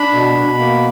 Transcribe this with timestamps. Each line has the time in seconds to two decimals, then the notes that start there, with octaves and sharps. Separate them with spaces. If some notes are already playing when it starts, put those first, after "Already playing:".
Already playing: D4 B5
0.14 B2
0.37 B2
0.59 A#3